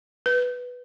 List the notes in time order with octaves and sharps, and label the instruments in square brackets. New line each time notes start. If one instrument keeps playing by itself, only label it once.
[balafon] B4